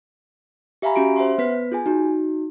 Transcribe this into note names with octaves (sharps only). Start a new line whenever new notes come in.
G4 E5 F5 G#5 A#5 B5
C#4 F#4 G4 D7
C5 E5 F#5 C6
B3 B4 B6
F4 G#4 G#5
D#4 F#4